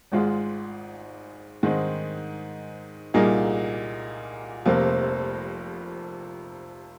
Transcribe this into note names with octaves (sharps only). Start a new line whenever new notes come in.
G#1 G#2 G#3 F4
G#2 D#3 G#3 C4 D#4
C2 A#2 A#3 D#4 G#4
F1 F2 C3 F3 A#3